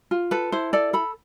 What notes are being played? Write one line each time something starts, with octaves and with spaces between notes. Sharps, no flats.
F4
A4 B4
E4 C5
A4 D5
A4 B5